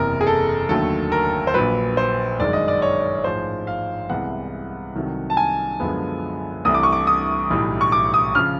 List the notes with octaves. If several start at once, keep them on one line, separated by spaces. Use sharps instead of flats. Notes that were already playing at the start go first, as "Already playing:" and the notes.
Already playing: F#1 E2 C3 A#4
G#4
A4
D#2 D3 F#3 A3 A4
A#4
C5
A#1 A#2 F#3 B4
C5
G1 F#2 D#3 G#3 D5
D#5
D5
C#5
A1 G#2 F3 G#3 C5
F5
C2 C3 E3 G#3 B3 F#5
C2 C3 D#3 F#3 A3
A5
G#5
F#2 D3 F3 G#3 B3
C2 C3 E3 A3 D#6
D6
C#6
D6
D#6
B1 A2 E3 G3
C#6
D6
D#6
C#3 F3 F6